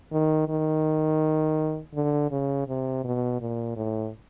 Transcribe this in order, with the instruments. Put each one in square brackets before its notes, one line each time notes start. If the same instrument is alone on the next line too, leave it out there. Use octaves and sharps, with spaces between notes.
[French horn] D#3
D#3
D3
C#3
C3
B2
A#2
A2